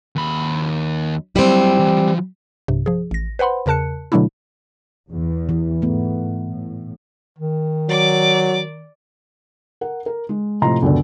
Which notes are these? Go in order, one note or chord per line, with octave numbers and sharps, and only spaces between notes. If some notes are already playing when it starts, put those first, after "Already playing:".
D#2 B5
F#3 G3 C4 E4
E3 F3
B1 G2 C3
F3 G#4
A1 A#6
B4 C5 F#5 B5 C6
E2 C#3 A#4 A5 F#6 C#7
B2 D3 F#3 A3 D4 E4
E2
E3
G#2 A3 B3
A2
D#3
F#3 D5 D6
A#4 F#5
A#4
G#3
A2 C3 F3 D#5 A#5 C6
C#2 F#2 B2 D3